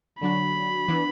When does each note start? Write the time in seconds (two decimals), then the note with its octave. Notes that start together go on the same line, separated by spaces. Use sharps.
0.21 D3 F#3 D4 F#4 B5
0.88 E3 B3 D4 B4